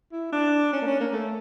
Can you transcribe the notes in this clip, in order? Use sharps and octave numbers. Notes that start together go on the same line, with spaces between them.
E4
D4
C#4
A#3
C#4
A#3
A3